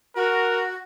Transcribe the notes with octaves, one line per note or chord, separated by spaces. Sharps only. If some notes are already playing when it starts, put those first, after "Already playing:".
F#4 A#4